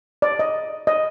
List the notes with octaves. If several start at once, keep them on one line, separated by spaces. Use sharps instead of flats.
D5
D#5
D#5